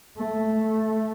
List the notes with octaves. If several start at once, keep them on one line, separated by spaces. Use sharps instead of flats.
A3